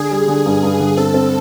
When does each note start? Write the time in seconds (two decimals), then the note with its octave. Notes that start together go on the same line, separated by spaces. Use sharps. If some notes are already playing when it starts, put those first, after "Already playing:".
Already playing: D3 G#4
0.11 G3
0.28 D3
0.46 G2
0.63 G2
0.80 D3
0.97 C4 A4
1.14 C4